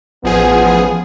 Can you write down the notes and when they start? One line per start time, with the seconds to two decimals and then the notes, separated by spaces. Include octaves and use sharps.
0.24 A1 F3 B3 G#4